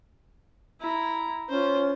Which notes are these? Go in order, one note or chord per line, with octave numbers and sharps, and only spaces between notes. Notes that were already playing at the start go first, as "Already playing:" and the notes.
E4 A#5
C#4 F4 C5